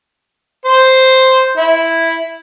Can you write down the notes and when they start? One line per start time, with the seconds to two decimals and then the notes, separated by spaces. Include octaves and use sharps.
0.65 C5
1.57 E4